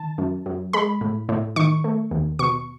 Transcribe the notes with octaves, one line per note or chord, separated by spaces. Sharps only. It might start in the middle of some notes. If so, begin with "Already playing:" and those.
Already playing: D#3 A5
F#2
F#2
G#3 B5
A2
A2
D#3 C#6
A3
D#2
B2 C#6